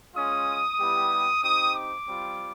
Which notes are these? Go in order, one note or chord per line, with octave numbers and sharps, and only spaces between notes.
G#3 C#4 F4 D#6
G3 B3 E4 G4
C4 D#4 G4 D#6
D6
G3 C4 F4